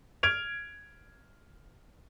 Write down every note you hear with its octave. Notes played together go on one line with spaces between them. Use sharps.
F6 G#6 D7 F7